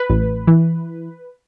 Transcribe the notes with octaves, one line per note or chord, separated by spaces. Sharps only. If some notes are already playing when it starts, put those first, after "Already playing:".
Already playing: B4
A1
E3